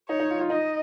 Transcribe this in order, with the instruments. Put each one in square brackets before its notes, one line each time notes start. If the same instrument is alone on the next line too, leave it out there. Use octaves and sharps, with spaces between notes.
[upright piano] D#4 [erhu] C#5
[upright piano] D#4
F4
F4
[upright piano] D#4 [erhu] D#5